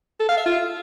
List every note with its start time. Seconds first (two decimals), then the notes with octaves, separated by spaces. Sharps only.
0.20 A4
0.28 F5
0.37 E5
0.45 F4